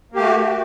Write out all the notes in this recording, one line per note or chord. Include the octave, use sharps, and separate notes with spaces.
A3 A#3 F#4 G4